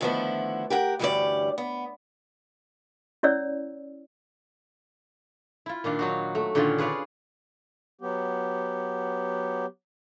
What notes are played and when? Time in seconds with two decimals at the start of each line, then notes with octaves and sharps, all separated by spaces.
0.01 D3 D#3 F3 A3 B3 E4
0.70 G4 A#4 F#5
0.99 D2 G2 E3 G3 C#4 D5
1.58 B3
3.23 C#4 E4 C#5 D5 E6
5.66 E4 F4
5.84 A#2 D#3 D4 F5
5.99 F#3 D#4 F#4
6.35 A3
6.55 A#2 D3 D#3 C#4 F4
6.78 G#4 B4 C#5 D5 F5
8.01 F#3 B3 G4